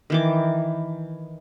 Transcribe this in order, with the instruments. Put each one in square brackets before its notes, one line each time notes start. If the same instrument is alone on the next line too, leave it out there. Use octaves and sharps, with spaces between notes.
[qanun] D#3 E3 D6